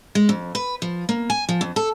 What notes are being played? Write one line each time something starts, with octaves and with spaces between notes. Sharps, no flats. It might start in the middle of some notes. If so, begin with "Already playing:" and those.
G#3
F2
B4
F3
A#3
G#5
F3
F2
A4